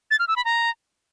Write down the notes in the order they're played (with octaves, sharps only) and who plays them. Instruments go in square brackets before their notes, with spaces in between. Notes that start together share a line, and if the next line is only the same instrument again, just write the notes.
[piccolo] A6
F6
E6
B5
A#5